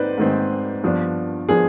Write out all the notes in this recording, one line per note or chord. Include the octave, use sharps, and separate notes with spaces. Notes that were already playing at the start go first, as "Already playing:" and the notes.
Already playing: G#2 D#3 G#3 C4 D#4 B4 C5 D5
G#2 D#3 G#3 C4 D#4
G2 F3 B3 D4
F3 B3 D4 G#4